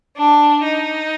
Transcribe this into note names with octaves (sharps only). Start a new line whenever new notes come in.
D4
D#4